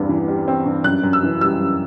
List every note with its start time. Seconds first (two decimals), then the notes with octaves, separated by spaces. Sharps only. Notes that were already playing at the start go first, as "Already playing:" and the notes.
Already playing: E2 G2 C4
0.09 E3
0.28 G3
0.48 C4
0.66 G2
0.84 F#2 F#6
1.03 F#2
1.13 E6
1.23 E3
1.41 G3 E6
1.60 F#2